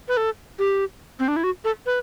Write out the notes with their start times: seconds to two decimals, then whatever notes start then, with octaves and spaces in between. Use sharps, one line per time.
0.08 B4
0.17 A4
0.59 G4
1.20 C4
1.28 D4
1.36 E4
1.44 F#4
1.65 A4
1.86 B4